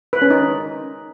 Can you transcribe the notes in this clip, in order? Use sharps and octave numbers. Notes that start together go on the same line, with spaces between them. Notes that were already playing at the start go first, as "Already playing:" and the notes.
B4
C#4
D#4